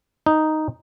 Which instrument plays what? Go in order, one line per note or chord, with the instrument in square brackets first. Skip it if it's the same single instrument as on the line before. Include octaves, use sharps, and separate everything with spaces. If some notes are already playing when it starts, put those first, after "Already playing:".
[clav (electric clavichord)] D#4